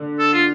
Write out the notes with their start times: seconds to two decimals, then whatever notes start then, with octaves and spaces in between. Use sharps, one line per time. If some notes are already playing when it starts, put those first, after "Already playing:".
Already playing: D3
0.19 A4
0.33 F4